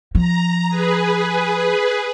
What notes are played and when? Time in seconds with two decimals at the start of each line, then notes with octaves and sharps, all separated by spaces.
0.15 F3 A#5
0.69 G#4 B4